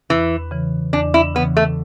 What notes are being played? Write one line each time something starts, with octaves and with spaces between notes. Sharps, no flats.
E2 E3
C#3 E3
E2 D4
E4
C#3 E3 B3
A3